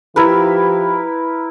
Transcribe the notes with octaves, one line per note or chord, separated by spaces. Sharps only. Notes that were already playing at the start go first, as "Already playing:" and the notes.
F3 E4 G4 A#4 B4